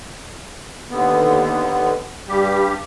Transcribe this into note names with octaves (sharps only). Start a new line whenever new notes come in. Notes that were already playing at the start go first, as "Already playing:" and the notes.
D#2 D3 B3
G2 G3 G4